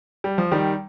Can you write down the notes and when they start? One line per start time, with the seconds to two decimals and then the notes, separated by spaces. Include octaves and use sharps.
0.24 G3
0.38 F3
0.52 D#3 G3